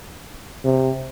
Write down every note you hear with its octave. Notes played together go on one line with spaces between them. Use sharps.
C3